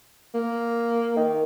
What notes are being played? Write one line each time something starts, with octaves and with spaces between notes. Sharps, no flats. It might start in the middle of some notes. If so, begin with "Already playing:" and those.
A#3
D#3